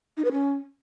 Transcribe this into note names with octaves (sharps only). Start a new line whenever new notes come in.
D#4
B4
C#4